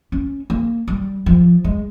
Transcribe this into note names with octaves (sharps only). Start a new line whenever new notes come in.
C#4
A#3
G3
F3
G#3